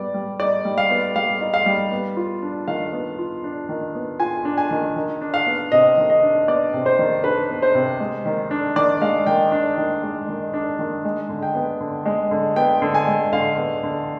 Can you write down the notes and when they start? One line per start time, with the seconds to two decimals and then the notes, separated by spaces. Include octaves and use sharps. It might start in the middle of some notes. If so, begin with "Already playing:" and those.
Already playing: G3 B3 D5
0.14 G3
0.40 D#4 D5
0.65 G3
0.78 F5
0.90 B3
1.16 G3 F5
1.41 D#4
1.54 F5
1.66 G3
1.92 B3
2.17 F4
2.43 D4
2.68 D#3 F5
2.93 B3
3.19 F4
3.44 D4
3.69 D#3
3.95 B3
4.20 F4 G#5
4.45 D4
4.57 G#5
4.71 D#3
4.96 D#3
5.21 D4
5.34 F5
5.46 B3
5.72 C3 D#5
5.98 D#3
6.10 D#5
6.23 D4
6.48 B3 D5
6.73 C3
6.86 C5
6.99 D#3
7.24 D4 B4
7.49 B3
7.62 C5
7.75 C3
8.00 G#3
8.26 D#3
8.51 D4
8.76 D#3 D5
9.01 G#3 F5
9.27 D#3 G5
9.52 D4
9.78 D#3
10.03 G#3
10.29 D#3
10.54 D4
10.79 D#3
11.05 G#3
11.29 D3
11.43 G5
11.55 B3
11.81 D3
12.06 G#3
12.31 D3
12.56 B3 G5
12.82 D3
12.94 G#5
13.07 G#3
13.33 D3 F5
13.58 B3
13.83 D3